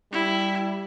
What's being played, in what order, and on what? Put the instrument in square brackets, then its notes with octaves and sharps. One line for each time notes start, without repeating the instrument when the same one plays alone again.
[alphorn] G3 [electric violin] E4